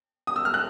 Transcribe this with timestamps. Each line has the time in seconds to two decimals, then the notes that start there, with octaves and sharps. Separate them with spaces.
0.27 D#6
0.36 E6
0.45 F6
0.54 F#6